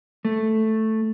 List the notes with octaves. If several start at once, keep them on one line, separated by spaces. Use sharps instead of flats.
A3